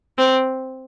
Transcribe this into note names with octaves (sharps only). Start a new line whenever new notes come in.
C4